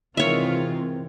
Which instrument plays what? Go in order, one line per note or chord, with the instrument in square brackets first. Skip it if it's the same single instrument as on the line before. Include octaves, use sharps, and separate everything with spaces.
[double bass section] C3 E3 C4 [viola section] D#3 G#3 F4 [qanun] C#5 E5